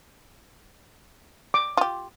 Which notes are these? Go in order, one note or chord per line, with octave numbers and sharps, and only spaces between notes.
D6
F4 G4